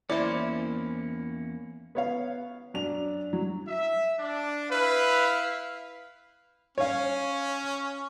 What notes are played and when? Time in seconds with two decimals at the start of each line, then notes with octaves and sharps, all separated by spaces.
0.10 E2 A#3 C#4 E4 C5 D5
1.95 B3 C#5 F5
2.74 F#2 D4 F7
3.33 F#3
3.68 E5
4.20 D4
4.71 E4 B4 E5 F5
6.78 C#4 C#5 F5